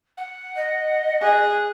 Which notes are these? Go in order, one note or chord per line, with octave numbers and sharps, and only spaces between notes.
F#5
D#5
G#4 F#6